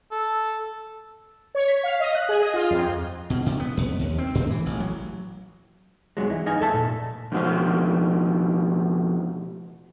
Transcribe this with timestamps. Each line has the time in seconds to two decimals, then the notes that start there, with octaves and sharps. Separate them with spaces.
0.12 A4
1.55 C#5
1.68 B6
1.83 F5
2.00 D#5
2.15 F#6
2.29 G#4
2.41 D#5
2.54 F4
2.70 F2
3.30 B2
3.46 C3
3.60 B3
3.77 F2
3.99 D#2
4.18 C4
4.35 A2
4.51 E3
4.66 A1
4.80 F#3
6.17 B1 B2 F#3 G#3
6.30 E3
6.46 D#4 D#5 F5 G#5
6.60 F2 A4 E5 A5
6.74 A#2
7.32 F2 B2 E3 F3